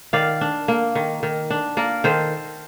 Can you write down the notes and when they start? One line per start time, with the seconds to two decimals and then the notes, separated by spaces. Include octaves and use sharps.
0.13 D#3 D5 F5
0.41 D4
0.68 A#3
0.95 D#3
1.23 D#3
1.50 D4
1.77 A#3 A#4 D5
2.04 D#3 A4 C5